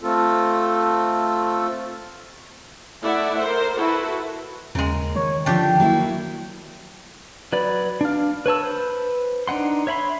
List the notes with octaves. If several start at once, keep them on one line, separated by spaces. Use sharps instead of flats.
A3 C4 F4 A4
A3 E4 D5 E5 F#5
A#4 C5
E4 F#4 A4 B4
D#2 C#3 G#3 A#4
D#3 C#5
D3 F3 D4 F4 G4 G5
F#3 A#3 E4
F#3 B4 D5 B5
D4 F5
B4 C#5 A5 E6
B4 C5
D4 D#4 F#5 C6
C#5 E5 B5 C6